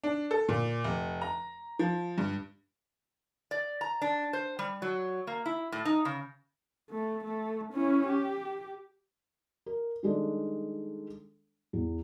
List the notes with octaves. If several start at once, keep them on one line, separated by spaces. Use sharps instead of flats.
D4
A4
A#2
F1
A#5
F3
G2
D5
A#5
D4
C5
G3
F#3
A#3
E4
A2
D#4
C#3
A3
A3
C#4 E4
G4
A#4
D#3 G3 G#3 D4 A4 D5
E2